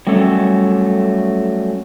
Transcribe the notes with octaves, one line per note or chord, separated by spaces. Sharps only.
F#3 G3 A3 C#4 A4